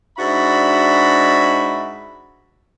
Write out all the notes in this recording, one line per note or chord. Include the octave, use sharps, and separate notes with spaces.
G#2 D4 F#4 E5 B5